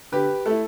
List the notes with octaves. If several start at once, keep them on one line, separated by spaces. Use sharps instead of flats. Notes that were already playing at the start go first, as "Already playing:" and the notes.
D3 G4 B4
A3 A4
E4